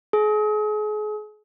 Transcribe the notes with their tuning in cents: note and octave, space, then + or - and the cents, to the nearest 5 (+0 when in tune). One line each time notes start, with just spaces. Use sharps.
G#4 +35